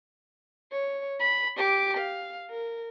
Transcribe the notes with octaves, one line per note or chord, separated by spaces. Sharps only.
C#5
B5
G4 D6
F5
A#4